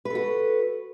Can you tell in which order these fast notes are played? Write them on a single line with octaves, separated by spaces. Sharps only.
B4 A4 F#4